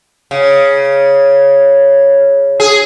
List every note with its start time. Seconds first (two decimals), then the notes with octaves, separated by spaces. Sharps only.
0.31 C#3
2.60 G#4